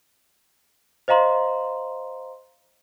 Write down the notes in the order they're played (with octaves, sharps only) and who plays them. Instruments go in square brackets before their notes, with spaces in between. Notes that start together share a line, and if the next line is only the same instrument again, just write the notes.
[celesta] C5 D#5 F5 A#5 C6